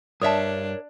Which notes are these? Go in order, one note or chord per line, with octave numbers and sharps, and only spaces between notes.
G2 D4 A#4 C#5 E5 A5 D#6